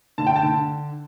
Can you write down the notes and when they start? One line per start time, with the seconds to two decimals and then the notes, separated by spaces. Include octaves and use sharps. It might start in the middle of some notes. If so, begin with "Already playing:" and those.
0.18 D3 A5
0.27 G5
0.36 A5
0.43 D3